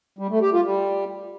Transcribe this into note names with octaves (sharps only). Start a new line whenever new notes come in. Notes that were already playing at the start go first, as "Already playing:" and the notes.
G3
A3
G4
F4
G3